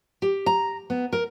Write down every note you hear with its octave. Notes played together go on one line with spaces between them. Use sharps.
G4
A#5
B3
A#4